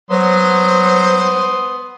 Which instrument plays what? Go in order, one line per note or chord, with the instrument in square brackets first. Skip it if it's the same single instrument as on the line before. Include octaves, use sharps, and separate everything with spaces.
[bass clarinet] F#3 [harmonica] B3 C6 D#6 [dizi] C5